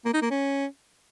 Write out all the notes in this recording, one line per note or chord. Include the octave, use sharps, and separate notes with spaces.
A#3
D#4
A#3
C#4